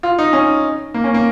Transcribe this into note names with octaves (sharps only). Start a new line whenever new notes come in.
F4
D#4
C#4
A#3
C#4
A#3